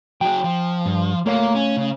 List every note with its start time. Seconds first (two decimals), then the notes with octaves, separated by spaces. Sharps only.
0.21 F#3 G#4 G5
0.44 F3
0.85 G2
1.26 A3 A#3 C#5 F5
1.55 C#4
1.77 C#3